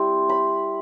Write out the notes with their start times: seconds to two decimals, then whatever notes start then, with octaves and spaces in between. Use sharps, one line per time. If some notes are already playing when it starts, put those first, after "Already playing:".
Already playing: G3 C4 E4 G5
0.29 B5